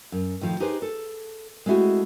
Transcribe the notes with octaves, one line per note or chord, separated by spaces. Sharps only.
F#2
A2 D#3 F3
D#4 G4 G#4 B4 C5
A4
G#3 A3 C4 E4 F#4 G#4